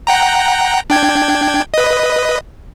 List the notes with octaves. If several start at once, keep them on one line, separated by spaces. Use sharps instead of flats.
F#5 G5 A#5
D4 G5 G#6
B4 D#5